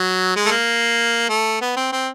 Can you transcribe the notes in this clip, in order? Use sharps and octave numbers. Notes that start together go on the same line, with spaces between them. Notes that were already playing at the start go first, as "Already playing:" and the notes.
Already playing: F#3
G#3
A3
A#3
A3
B3
C4
C4